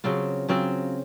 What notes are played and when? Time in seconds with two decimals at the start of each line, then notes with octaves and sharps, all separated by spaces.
0.04 C#3 F#3 C4 F4
0.49 C#3 F#3 C4 F4